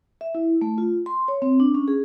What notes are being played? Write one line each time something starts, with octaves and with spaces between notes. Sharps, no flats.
E5
E4
A3
F4
C6
C#5
C4
D4
C#4
G#4